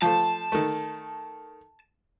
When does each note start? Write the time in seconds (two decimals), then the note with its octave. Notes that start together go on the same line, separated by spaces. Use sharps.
0.02 F3 A3 A5
0.52 D#3 A3